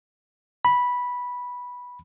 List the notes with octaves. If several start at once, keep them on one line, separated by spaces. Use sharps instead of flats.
B5